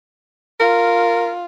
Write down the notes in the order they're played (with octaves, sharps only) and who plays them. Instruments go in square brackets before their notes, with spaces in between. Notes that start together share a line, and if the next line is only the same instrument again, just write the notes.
[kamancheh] F4 [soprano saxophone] A#4